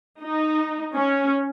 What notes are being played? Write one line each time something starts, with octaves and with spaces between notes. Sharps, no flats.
D#4
C#4